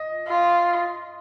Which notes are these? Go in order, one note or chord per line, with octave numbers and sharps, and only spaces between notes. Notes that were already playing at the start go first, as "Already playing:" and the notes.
Already playing: D#5
F4